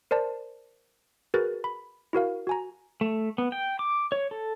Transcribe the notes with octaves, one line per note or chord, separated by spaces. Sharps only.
A#4 C5 D5 A5
F#4 G#4 A#4 B4 A6
B5
E4 F#4 A#4 F5
F#4 G#5 A#5
A3
B3
G5
D6
C#5
A4